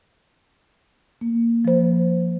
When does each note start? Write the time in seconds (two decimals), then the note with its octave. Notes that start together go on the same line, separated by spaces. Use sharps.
1.21 A#3
1.65 F3 C5